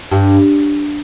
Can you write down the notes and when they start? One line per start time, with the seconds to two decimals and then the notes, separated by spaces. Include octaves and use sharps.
0.11 G2